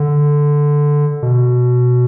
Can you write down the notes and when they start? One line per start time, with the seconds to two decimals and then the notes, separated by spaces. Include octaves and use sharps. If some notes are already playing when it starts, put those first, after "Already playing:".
Already playing: D3
1.23 B2